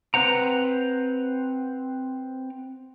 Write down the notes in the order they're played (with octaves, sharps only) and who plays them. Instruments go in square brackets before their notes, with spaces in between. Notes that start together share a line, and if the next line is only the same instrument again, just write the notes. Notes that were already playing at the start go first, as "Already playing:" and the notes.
[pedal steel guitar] C4 B4 C5 F#5 A#5